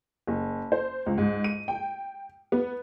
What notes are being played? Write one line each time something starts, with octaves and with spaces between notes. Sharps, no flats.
F#1
C5
C#2
G#2
D#7
G5
B3